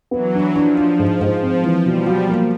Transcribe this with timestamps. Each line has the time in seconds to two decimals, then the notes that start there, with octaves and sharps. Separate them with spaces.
0.11 E3 F#3 B3
0.34 D4
0.55 F3 D4
0.78 D4
0.99 G#2
1.21 G#2
1.42 F3 C4
1.64 E3
1.85 B2 F3 G3
2.07 F#3
2.29 A#3